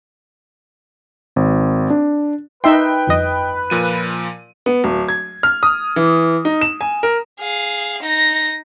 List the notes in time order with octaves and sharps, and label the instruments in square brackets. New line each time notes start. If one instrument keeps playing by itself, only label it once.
[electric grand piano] G#1
D4
[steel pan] D#4 E5 C6 [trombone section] B4 [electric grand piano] G5
[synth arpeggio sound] G1 F2 D#5
[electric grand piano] A#2 F3 D#7
[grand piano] B3
D1
G#6
F6
D#6
E3
D#4
E7
G#5
A#4
[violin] G#4 F5
D#4 A#6